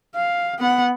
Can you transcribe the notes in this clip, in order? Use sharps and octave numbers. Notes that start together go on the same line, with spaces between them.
F5
B3 F#5